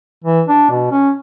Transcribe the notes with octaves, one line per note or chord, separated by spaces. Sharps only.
E3
D4
B2
C#4